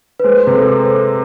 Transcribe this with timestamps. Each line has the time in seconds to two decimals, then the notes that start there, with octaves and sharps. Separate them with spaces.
0.20 B4
0.24 G#3 C5
0.39 B4
0.47 C3
0.55 A4